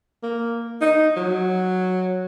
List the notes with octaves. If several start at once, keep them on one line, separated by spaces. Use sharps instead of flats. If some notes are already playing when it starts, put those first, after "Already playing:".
A#3
D#4
F#3